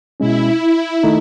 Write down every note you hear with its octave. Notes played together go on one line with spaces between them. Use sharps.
B2 G#3 C#4 E4
D#3 A3 D#4